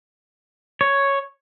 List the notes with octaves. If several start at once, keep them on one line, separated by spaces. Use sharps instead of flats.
C#5